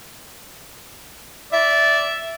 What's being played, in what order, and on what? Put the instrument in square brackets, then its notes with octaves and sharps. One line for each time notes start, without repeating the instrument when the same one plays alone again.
[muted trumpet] D5 [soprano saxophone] E5